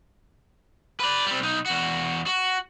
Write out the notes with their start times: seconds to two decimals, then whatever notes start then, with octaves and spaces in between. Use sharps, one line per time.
1.00 B4 D5
1.26 G3 C4
1.40 B1 D#4
1.66 E2 F#4
2.26 F#4